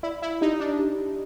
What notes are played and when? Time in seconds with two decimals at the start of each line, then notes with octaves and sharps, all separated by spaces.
0.03 E4 D5
0.22 E4
0.41 D#4 G4
0.60 D4
0.79 G4